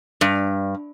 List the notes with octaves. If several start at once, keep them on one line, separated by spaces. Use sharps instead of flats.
G2